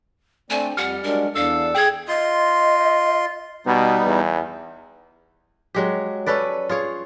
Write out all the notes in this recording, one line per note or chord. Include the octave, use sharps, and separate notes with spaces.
A3 C4 D4 G#5
F2 G3 F#5 F6 C#7
F#3 G#3 D4 A#4
E2 D4 A4 F5
G#4 G5 G#6
F4 D#5 C6
B2 G3 B3 D#4
E2
F#3 G#3 G4
C#4 A4 B4 D5
F4 G#4 C#5